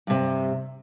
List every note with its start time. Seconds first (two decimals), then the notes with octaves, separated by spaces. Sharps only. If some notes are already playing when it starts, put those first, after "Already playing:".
0.07 G2 C3